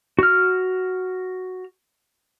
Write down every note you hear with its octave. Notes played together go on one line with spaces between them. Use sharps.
F#4 F6